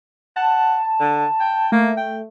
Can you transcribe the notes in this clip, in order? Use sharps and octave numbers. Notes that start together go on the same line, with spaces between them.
F#5 A5
D3
G5
A3 A#3
G5